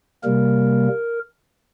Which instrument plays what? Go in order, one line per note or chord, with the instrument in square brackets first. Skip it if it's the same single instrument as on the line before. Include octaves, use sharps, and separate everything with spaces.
[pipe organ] C3 G3 A#3 A#4